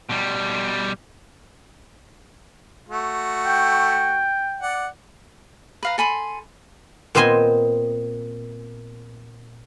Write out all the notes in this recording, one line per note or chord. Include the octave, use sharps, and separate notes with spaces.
B2 G3
A3 F#4
G5
D5 F#5
B4 F5 A#5
A4 G#5 B5 C6
A#2 B3 C4 C5 D#5 G#5